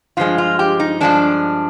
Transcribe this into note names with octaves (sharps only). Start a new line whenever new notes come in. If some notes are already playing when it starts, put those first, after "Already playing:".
G2 F3 G#3 F4
F4
G4
D#4
G2 F3 G#3 D4